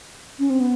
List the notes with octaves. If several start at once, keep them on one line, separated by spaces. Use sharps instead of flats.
C#4
C4
B3